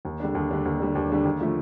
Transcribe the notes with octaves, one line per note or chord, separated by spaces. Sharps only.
D#2
D3 G3 D4
D#2
D3 G3 D4
D#2
D3 G3 D4
D#2
D3 G3 D4
D#2
D3 F3 A3